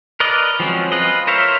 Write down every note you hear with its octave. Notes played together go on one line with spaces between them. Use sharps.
A#4 B4 D5 D#5
F3 F#3 G#3 C4 C#4
F4 B4 D#5
A#4 C5 C#5 E5 F5